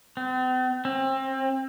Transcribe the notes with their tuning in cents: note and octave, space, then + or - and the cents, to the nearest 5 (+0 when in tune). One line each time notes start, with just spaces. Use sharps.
C4 -45
C4 +30